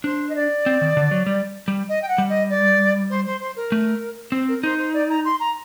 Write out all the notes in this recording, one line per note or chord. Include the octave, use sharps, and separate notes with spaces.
D4 C5
D#5
D5
C4
D#3
D3
F#3
G3
G3
D#5
G5
F#5
G3
D#5
D5
C5
C5
C5
A#4
A3
C4 C5
A#4
D#4 C5
C5
D5
A#5
C6
A#5